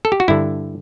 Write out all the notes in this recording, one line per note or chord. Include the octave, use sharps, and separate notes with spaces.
A4
G4
F#4
G2 D3 E4